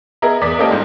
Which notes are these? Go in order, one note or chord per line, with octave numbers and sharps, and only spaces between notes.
B3 G#4 A#4 D#5 E5 A#5
E2 D5 D6 D#6 B6
A#3 C#4 G4 A4 D#5 G5
G1 G#2